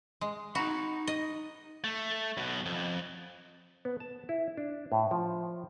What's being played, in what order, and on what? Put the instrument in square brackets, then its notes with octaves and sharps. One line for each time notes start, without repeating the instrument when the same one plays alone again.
[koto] G#3
[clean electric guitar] D#4 A#5 B5 [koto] F#4
[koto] D#5
[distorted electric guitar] A3
B1 B2
F2
[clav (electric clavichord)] B3
A5
E4
D4
A2
F3